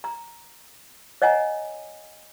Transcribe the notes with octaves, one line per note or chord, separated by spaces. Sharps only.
A#5
C#5 D#5 F#5 G#5 A#5